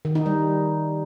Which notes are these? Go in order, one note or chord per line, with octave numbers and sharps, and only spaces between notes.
D#3
D#4
G3